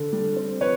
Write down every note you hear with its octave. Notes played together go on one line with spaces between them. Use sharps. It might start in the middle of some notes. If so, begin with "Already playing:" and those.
Already playing: D3
G3
C4
F3 B4 C#5